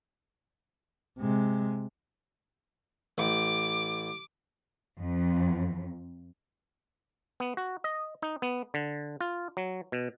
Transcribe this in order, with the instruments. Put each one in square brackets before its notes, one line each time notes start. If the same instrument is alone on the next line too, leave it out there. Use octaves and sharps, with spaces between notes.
[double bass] C3 G#3
[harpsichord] A1 [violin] D6
[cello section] F2
[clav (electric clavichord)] B3
F#4
D#5
D#4
B3
D3
F4
F#3
B2